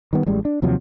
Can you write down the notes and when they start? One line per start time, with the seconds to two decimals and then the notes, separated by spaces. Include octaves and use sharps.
0.13 D#3 G3 B3
0.27 A1 G3 G#3
0.45 D4
0.62 D#2 C3 F3 F#3